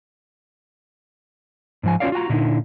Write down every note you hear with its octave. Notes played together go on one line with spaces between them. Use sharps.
G#2 F3 G#5
C#4 F4 F#4 C#5 D5 F5
F4 F#4 G5 A#5
A#2 D3 D#4 E4